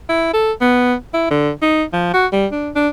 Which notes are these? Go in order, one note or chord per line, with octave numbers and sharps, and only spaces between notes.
E4
A4
B3
E4
D3
D#4
F3
F#4
G3
D4
D4